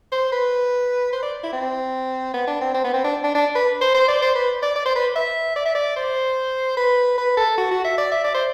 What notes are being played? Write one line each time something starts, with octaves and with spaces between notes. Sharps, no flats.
C5
B4
C5
D5
E4
C4
B3
D4
C4
C4
B3
C4
D4
D4
D4
B4
C5
C5
D5
C5
B4
D5
D5
C5
B4
E5
D5
E5
D5
C5
B4
B4
A4
F#4
F#4
E5
D5
E5
D5
C5